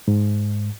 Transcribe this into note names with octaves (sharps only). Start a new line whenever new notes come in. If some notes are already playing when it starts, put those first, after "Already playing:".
G#2